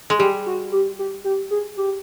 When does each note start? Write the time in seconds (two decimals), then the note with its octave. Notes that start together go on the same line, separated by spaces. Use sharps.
0.10 G#3 G#4
0.19 G3 G4
0.46 F#4
0.72 G4
0.99 G4
1.24 G4
1.51 G#4
1.77 G4